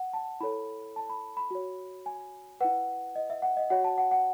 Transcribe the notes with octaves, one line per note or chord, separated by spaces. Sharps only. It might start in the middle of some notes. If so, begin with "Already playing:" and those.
Already playing: F#5
A5
E4 A4 C#5 B5
A5
B5
B5
F#4 C#5
G#5
E4 B4 F#5
D#5
E5
F#5
D#5
F#4 C#5 F#5
A5
F#5
F#5